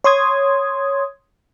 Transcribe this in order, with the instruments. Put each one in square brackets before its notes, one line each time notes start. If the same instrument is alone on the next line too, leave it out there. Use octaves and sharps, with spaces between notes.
[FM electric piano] C#5 C6 D#6 G#6